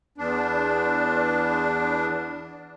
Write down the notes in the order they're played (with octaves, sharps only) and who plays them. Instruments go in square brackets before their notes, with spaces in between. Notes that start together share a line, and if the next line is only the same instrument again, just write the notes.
[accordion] E2 D4